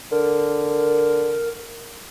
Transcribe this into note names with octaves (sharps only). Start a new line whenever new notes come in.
D3 A#4